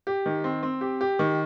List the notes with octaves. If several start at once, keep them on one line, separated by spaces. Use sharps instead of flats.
G4
D#3
C4
C4
G4
G4
D#3